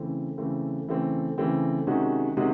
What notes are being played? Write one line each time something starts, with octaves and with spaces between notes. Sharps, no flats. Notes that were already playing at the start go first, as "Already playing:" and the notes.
Already playing: C#3 E3 A3 C4
C#3 E3 A3 C4
C#3 E3 A3 C4
C#3 E3 A3 C4
C3 D#3 G#3 C#4 F#4
C3 D#3 G#3 C#4 F#4